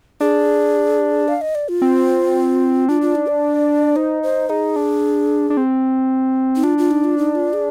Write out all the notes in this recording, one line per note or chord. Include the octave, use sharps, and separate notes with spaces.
D4 G#4
F5
D#5
D5
F4
C4
D4 F4
F4
D#4
D5
D#4 C5
C5
D#4 G#4
D4
D4
C4
D#4
D4 F4
F4
D#4
F4
D#4
F4
G#4